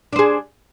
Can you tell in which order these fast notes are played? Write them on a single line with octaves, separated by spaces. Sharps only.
D4 C5 G#4